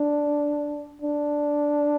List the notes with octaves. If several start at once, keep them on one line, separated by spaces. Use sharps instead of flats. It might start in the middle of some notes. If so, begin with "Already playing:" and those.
Already playing: D4
D4